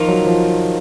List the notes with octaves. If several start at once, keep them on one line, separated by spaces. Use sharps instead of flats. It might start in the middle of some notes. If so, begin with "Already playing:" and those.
Already playing: D#3 F3 A#3 F4
F#3
F3